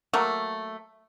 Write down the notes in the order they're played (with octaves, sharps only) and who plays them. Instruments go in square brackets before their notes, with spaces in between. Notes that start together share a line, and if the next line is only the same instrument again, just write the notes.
[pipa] F#3 A3 A#3